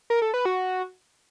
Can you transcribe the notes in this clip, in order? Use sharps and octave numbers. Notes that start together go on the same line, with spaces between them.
A#4
A4
B4
F#4